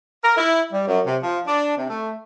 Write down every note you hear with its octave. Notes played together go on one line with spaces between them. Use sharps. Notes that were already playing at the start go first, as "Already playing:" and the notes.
A#4
E4
G3
F#2
C3
F3
D4
C3
A3